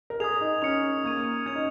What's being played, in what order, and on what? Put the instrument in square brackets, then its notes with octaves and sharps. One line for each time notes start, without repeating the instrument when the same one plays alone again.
[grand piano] A#4
[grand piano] G#4 [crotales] D#6 G#6 F7
[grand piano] D#4
[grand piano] C#4 [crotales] F6 C#7 F7
[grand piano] A#3 [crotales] C#6 G#6 D#7
[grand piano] C#4 [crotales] G#6 F7
[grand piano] D#4